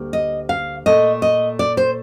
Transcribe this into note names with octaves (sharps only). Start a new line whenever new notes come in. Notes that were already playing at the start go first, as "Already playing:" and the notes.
Already playing: D2 G3 A#3
D#5
F5
A#2 A3 D#5
D#5
D5
C5